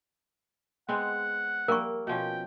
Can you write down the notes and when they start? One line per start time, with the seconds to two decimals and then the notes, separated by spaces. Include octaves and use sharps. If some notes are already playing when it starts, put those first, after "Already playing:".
0.89 G#3 B3 C4 F#5
1.68 G3 A#3 A#4 C#6
2.07 B2 F3 C#4 G5